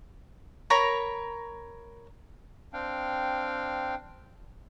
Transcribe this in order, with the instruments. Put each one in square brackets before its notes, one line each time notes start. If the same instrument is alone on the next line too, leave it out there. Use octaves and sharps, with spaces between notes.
[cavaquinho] A#4 C#5 A#5 B5
[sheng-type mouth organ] C4 D4 F5 G5